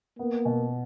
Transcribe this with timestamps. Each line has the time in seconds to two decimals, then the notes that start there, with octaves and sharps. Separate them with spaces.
0.19 A#3 B3
0.45 B2